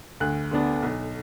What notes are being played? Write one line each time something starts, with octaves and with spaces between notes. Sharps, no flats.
D2 F#6
D3 B3 D4
B1